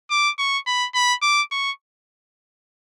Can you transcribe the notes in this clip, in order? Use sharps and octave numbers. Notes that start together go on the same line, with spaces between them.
D6
C#6
B5
B5
D6
C#6